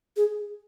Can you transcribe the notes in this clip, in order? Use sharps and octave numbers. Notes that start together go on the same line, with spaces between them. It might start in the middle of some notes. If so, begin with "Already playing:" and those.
G#4